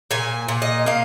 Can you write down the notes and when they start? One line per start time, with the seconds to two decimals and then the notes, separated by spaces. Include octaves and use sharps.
0.11 A#2 G#5
0.48 A#2
0.62 D#5
0.86 A#3 F5